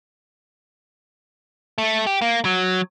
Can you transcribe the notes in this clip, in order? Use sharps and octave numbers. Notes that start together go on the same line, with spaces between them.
A3
G4
A#3
F#3